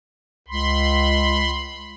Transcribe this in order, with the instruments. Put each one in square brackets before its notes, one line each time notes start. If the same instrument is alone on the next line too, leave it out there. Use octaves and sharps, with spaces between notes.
[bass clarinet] C#2 [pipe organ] B5 C6